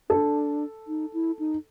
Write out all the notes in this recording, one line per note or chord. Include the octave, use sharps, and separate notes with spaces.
D4 A4
D#4
E4
D#4